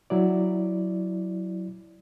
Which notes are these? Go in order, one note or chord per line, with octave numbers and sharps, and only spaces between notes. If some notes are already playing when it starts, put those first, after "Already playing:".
F#3 E4 D5